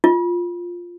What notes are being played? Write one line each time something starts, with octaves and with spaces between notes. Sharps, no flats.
F4